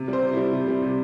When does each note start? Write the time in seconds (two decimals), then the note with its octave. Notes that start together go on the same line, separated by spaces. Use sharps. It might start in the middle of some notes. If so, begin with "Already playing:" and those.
Already playing: C3
0.08 G3 C5
0.22 C3
0.33 G3 E4
0.53 C3
0.68 G3
0.83 C3